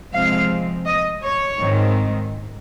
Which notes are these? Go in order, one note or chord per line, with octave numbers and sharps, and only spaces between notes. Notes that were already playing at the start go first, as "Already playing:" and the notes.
C3 F3 G#3 C4 F5
D#5
C#5
G#2 D#3 G#3 C4